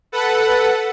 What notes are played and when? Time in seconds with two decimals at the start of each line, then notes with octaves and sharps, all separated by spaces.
0.12 A4 B4 F#5